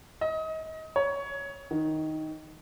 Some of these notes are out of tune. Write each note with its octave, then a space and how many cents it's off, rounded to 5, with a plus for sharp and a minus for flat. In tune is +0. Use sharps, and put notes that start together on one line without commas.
D#5 +30
C#5 +15
D#3 +5